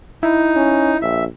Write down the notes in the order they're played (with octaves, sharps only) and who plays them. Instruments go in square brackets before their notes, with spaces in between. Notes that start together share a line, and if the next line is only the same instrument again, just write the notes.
[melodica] D#4 [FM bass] E4
[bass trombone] C#4
[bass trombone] A#1 [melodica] E5